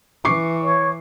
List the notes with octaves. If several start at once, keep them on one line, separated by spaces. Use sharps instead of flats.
E3 C#6 D6 C7
C#5